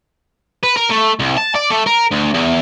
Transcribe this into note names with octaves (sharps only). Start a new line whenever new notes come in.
B4
A#4
A3
C2
A5
D5
A3
A#4
D2
E2